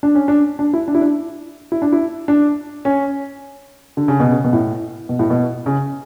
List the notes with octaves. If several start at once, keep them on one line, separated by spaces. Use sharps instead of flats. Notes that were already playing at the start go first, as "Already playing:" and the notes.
D4
C#4
D4
D4
E4
D4
E4
D4
E4
D4
E4
D4
C#4
D3
C#3
B2
C#3
B2
A2
B2
A2
B2
C#3